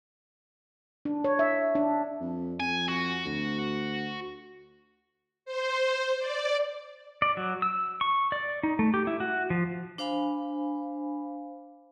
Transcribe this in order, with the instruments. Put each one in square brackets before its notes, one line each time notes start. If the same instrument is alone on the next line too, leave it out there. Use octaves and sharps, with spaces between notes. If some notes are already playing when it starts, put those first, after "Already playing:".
[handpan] D4
C#5
E5
D4
[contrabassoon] F2
[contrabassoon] F2 [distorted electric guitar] G#5
[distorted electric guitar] F#4
[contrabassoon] D2
[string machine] C5
D5
[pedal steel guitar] D5
F#3
E6
C#6
D5
D#4
A3
G4
E4
F#4
F3
[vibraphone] D4 C5 F5 G#5 B5